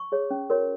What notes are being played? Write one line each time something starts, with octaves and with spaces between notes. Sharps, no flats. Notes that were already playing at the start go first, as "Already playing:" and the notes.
Already playing: C#6
G#4 C#5
C#4
F#4 A#4 C#5